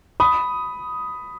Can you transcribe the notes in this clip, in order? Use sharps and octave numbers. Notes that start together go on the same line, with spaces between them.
B5 D#6